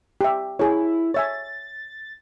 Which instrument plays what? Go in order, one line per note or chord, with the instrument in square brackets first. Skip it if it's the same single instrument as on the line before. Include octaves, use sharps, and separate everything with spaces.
[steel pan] G4 E5
[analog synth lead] E4 [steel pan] G#4 C#5
[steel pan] C#5 E5 G#5 [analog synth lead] A6